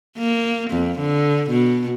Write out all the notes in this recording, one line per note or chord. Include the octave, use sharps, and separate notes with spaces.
A#3
F2
D3
B2